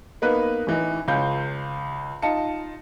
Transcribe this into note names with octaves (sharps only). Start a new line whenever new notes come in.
A#3 B3 D#4 B4
A1 E3 D#4
C#2 C#4 F4 G6
D#4 F4 A5 C#7